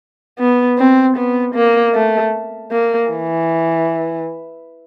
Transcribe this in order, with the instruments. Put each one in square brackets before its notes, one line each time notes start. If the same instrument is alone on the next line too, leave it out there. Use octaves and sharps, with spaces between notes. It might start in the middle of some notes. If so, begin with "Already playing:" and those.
[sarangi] B3
C4
B3
A#3
A3
A#3
E3